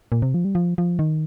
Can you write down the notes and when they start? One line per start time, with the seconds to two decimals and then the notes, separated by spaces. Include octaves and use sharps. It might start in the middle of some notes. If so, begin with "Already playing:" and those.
0.12 A#2
0.22 C3
0.34 F3
0.45 G3
0.55 F3
0.78 F3
0.99 D#3